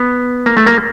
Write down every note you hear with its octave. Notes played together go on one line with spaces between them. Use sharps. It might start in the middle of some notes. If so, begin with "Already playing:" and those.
Already playing: B3
A#3
A3
A#3